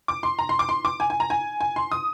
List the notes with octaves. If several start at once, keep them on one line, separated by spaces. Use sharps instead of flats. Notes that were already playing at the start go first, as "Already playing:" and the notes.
D6
C6
A#5
C6
D6
C6
D6
G#5
G#5
A#5
G#5
G#5
C6
D#6